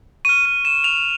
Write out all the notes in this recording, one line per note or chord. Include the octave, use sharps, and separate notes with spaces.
C#6 F6 D#7
D#7
E7
F7